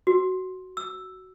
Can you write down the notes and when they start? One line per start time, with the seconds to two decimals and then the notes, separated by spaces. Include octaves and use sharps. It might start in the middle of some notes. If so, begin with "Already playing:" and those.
0.07 F#4
0.77 E6